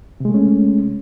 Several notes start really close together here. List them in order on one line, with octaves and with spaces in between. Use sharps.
C3 G#3 A3 C#4